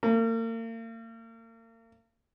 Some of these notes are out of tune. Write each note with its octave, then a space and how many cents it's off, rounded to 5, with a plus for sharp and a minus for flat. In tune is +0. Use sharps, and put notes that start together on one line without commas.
A#3 -40